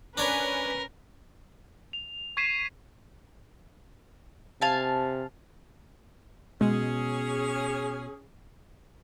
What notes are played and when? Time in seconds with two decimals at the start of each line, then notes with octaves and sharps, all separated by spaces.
0.18 C#4 D4 A#4 B4 C#5
1.93 F7
2.37 C#6 G#6 B6 C7 D#7 E7
4.62 C3 F5 G#5 A5
6.61 B2 G#3 C#4 G#4